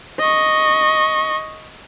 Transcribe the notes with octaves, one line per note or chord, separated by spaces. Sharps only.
D#5 C#6